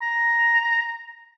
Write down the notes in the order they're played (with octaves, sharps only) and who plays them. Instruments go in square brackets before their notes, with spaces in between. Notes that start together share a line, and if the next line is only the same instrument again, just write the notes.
[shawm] A#5